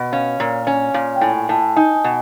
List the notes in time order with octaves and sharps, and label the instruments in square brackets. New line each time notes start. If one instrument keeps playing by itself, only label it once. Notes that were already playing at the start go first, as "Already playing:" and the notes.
Already playing: [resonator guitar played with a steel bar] B2
[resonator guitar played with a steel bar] C#4 [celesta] F5
[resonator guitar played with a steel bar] A#2
[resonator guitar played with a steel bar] C#4 [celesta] G#5
[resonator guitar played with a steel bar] A#2
[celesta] G5
[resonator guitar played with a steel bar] A2 [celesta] G#5
[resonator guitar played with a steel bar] A2 [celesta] A5
[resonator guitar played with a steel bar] D#4 [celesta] G#5
[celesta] G#5
[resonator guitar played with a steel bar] B2